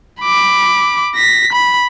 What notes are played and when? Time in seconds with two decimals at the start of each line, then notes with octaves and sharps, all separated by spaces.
0.22 B5 D6
1.16 A#6 B6
1.53 B5